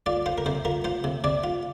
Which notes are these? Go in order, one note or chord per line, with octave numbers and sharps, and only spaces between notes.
F4 D5
F4 C5
A#4
C3 C5
F4 A#4
F4 C5
C3
C3 D5
F4